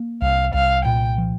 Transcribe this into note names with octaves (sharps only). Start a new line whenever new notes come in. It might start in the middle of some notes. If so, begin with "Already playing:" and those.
Already playing: A#3
C2 F5
C2 F5
A#2 G5
F3